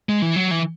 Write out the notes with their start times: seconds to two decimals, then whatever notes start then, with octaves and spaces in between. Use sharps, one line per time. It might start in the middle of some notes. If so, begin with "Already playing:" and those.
0.09 G#3
0.22 E3
0.36 F#3
0.51 E3